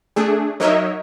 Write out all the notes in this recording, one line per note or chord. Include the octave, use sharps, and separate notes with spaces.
A3 D4 G#4
F#3 D#4 A#4 C#5 D#5 E5